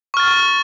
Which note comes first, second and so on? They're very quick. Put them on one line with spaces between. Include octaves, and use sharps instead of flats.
C#6 F6 A6